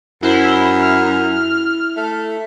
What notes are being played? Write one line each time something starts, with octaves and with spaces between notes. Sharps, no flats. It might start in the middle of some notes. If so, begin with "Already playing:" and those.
F#2 E4 C5
F6
A3